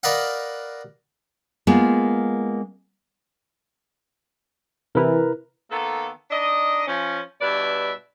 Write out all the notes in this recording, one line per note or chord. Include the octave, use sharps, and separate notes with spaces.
A#4 B4 D5 D#5 F5 F#5
G#3 A#3 B3 F4
C3 E3 E4 A#4 B4 A#5
D#3 A#3 B3 A4
D4 D#4 D#5
F3 C#4
G2 B2 B4 D5 E5